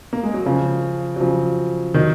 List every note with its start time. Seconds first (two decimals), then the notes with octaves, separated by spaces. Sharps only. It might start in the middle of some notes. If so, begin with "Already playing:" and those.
0.13 A#3
0.24 G#3
0.34 F#3
0.46 C#3 F3
1.16 F#3
1.20 C#3 F3
1.94 D#3 F#3